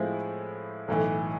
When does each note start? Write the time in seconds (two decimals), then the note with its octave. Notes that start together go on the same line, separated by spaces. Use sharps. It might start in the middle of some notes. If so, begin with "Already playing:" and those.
Already playing: A2 F3 G#3 C4 E4
0.88 B1 A2 E3